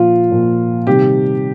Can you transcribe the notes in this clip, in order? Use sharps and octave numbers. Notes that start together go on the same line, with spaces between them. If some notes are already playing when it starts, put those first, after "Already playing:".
Already playing: A#2 F3 F4
A#2 F3
C3 D#3 G3 G4